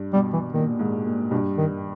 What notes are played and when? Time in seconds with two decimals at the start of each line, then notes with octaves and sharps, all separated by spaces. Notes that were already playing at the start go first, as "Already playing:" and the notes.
Already playing: G2
0.13 B2 G3
0.33 E3
0.53 A#2 D#3
0.79 G#2
1.05 A#2
1.31 G2 B2
1.58 D#3